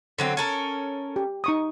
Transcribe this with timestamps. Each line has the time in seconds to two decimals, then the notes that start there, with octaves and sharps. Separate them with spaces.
0.19 D3 F#3 C4
0.37 C#4 A4 A#4
1.16 G4
1.44 D#4 C#6 D#6